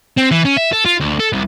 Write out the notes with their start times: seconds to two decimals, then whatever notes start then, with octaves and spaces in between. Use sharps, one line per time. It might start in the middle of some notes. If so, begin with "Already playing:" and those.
0.18 C4
0.32 E3
0.45 C#4
0.57 E5
0.73 A4
0.86 F4
1.01 D2
1.20 A4
1.33 C2